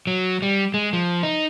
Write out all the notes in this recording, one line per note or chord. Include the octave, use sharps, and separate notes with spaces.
F#3
G3
G#3
F3
D#4